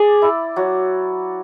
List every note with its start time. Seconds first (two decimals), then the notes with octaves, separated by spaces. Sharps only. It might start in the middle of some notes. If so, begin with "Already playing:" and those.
Already playing: G#4 D5
0.22 E4
0.56 F#3